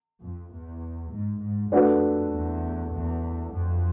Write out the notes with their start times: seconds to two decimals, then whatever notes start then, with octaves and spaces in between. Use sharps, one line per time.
0.21 F2
0.52 E2
1.12 G#2
1.42 G#2
1.72 F2 A3 D4 F#4 B4
2.33 E2
2.93 E2
3.54 F2